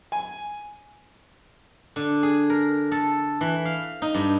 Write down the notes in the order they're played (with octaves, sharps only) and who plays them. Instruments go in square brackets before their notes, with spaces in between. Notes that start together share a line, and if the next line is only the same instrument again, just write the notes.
[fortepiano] G#5
[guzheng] D3
G#4
A#4
A4
E3
F5
D#4
G2